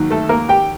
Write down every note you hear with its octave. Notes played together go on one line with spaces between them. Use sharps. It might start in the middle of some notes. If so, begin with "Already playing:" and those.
Already playing: D#2 D#3 F#3
A3 A4
A#3 A#4
G4 G5